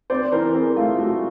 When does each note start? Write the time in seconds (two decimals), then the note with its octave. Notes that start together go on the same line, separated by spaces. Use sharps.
0.10 C4 C5 D5
0.32 E3 A#4 C5
0.54 C4 G#4 A#4
0.76 A3 F4
0.99 A3 F#4